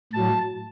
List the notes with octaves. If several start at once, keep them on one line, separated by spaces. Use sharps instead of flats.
A2 F#3 A5